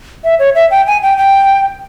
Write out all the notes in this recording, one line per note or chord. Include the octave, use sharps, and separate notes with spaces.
E5
C#5
E5
G5
G#5
G5
G5